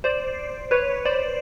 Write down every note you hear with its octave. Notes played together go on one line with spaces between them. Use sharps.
C5 D5
B4 C#5
C5 D5